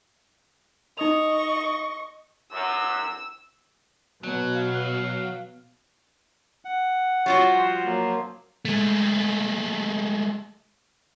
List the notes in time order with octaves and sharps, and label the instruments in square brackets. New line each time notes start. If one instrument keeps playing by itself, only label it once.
[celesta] D#4 D#6 F7 [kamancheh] D#5 C#6
[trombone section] F#2 [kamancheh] E6
[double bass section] B2 [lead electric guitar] F#3
[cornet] F5
[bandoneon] F#5
[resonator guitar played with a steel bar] G3 F4 F#4 [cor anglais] C#5
[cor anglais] F3
[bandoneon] F#3 A#3
[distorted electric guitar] G#3 A3